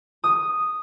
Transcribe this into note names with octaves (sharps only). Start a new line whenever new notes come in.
D#6